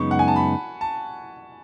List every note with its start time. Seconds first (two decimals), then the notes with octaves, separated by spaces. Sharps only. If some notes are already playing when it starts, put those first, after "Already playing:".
Already playing: F#2 C#3 G#3 B3 D#4 C#6
0.11 F#5
0.19 G#5
0.28 A5
0.36 B5
0.81 A5